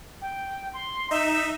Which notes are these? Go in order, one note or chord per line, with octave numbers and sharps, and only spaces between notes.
G5
C6
D#4 E5